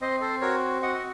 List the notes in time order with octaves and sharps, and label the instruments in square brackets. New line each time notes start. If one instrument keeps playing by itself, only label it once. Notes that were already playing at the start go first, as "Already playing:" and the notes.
[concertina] C4 C5 D#5
A4 C5
F#4 A#4 C#5
F#4 D#5 F#5
D#5